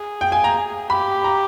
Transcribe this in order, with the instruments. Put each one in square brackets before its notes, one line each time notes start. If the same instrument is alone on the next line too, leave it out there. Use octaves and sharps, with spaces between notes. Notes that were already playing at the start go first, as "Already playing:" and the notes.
Already playing: [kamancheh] G#4
[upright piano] G5
G#5
A#5
[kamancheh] G4 [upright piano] B5
[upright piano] A#5